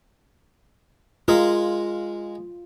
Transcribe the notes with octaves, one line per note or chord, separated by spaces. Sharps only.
G#3 F4 G#4 A#4